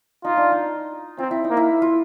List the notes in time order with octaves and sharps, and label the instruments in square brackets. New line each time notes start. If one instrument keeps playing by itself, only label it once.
[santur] D#4 [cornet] F4
[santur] D4
D#4
[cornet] C4 [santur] F4
[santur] E4
D#4
[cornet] A#3
[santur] E4
F4